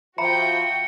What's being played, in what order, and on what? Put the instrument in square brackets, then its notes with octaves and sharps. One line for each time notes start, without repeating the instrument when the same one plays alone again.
[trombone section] F3 [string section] F#4 G5 [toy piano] E5 A#5 B5 [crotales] C#7